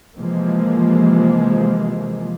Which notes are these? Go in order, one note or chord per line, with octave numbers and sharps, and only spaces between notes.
C3 E3 F3 G#3 A#3